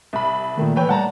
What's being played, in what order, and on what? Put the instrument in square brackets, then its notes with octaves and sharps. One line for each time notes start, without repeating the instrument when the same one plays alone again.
[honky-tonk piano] C2 B5
[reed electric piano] A#2 A3 [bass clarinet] D#3
[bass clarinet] E3 [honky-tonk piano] B4 C#5 G5
[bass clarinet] G3 [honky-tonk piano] F#5 A5 A#5